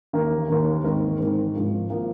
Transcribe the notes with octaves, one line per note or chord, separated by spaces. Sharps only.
D#2 D#3 A#3
D#2 D#3 A#3
G#2 D#3 C4 D#4 A#4
G#2 D#3 C4 D#4 A#4
G#1 G#2 F3 A#3
F3 A#3